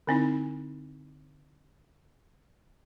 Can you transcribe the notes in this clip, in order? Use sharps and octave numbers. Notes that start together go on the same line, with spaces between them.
D3 C4 D#4 E4